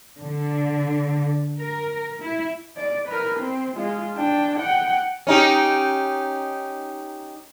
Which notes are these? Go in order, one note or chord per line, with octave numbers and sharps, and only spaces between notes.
D3
A#4
E4
D5
A#4 B4
C4
G#3 F4
D4 G5
F#5 G5
C#4 D#4 G4